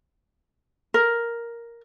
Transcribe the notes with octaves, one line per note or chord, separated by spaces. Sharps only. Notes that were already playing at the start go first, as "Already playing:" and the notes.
A#4